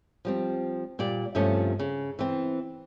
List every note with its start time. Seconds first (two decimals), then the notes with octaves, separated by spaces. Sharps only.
0.25 F3 G3 C4
0.99 A#2 G3 D5
1.35 G2 C3 F3 A3 C#4
1.79 C#3
2.19 E3 C4